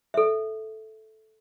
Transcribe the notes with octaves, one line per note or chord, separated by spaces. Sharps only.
A4 E5